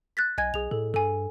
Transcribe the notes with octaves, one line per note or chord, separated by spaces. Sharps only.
F#6 A6 B6
B1 D#5 G#5 G#6
B1 G#4 F7
A2 A4
G2 A4 G#5